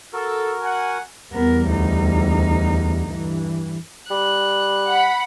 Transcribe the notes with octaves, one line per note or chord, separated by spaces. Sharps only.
F#4 A4 A#4
F#5 G#5
E2 G3 B3 A#4
D2 D#4
G2 E3
G3 F#6
F#5 B5